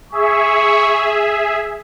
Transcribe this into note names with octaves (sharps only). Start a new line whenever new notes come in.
G#4 E5 C#6